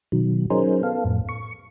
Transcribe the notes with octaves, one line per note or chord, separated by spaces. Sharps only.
B2 D#3 F#3
F#3 C#4 D#4 G#4 A#4 C5
B3 A4 F5
F2 A2
C#6